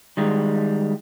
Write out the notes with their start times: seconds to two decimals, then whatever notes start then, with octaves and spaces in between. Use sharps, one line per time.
0.17 D#3 G3 G#3